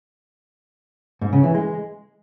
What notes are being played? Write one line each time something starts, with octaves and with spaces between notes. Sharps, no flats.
G#2
C#3
E3
G#3